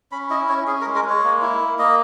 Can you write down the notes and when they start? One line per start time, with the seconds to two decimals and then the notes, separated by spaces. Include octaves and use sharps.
0.12 C#4 B5
0.30 E4 D#5
0.49 C#4 C#5
0.67 C#4 G#4
0.81 A#4
0.86 G#3
0.96 A#4
1.05 G#3 C#5
1.24 A#3
1.42 E4
1.60 A#3
1.79 A#3 D#5